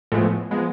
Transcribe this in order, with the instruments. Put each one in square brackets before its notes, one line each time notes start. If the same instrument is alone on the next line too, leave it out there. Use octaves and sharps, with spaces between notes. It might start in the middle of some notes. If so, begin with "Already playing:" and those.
[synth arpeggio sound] A2 A3 [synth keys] F3 G#3 B3
[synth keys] F3 G#3 B3